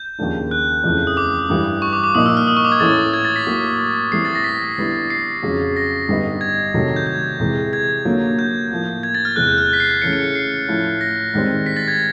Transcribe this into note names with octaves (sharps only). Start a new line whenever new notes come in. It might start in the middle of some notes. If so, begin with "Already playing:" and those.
Already playing: G6
D#2 C#3 F3 A#3 D4
F#6
F2 C#3 E3 A3
D#6
D6
G2 E3 G3
C#6
D6
D6
A#2 F3 A#3 D#4 D#6
E6
F6
D#6
C#6
D6
G#6
A2 E3 A3 C#4 E4 A6
G#6
A6
B6
A2 F#3 A#3
A2 E3 G3 C4 C7
A6
A#6
B6
D3 G3 B3 E4
C7
F2 C#3 F#3
A#6
G2 D3 G3 B3 D#4
G#6
C3 D#3 F#3 A3
G6
G#6
C3 E3 G#3
G#6
D3 F#3 A#3
G6
A2 F3 A#3
G#6
A6
F6
E2 C3 E3 G#3 F#6
G6
F6
B6
C7
C7
C#3 E3 A3 C#4 C#7
C#7
C#7
C7
A2 F3 A3 C#4 E4
A#6
G#2 D#3 G3 C4
B6
A6
G#6